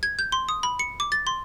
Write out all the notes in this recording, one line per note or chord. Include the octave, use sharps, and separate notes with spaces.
G#6
G6
C6
D#6
B5
C#7
D6
A6
C6